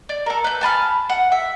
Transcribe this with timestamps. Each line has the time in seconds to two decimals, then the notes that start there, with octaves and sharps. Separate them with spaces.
0.09 D5
0.26 A4 A#4
0.44 B4 G6
0.61 G#5 A5 B5 F6
1.09 F#5
1.32 E5